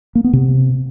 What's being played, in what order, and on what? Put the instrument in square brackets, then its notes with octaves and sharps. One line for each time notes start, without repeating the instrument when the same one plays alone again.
[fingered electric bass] A#3
B3
C3